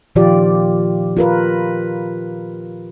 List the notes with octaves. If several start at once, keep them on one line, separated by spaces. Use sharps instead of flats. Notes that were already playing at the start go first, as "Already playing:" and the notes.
A#2 D#3 F3 F4 G4 D5
F4 A#4 B4